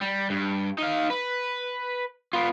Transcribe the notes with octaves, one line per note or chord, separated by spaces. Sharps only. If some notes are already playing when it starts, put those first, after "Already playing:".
G3
G2
D#4 F5
B4
B3 F4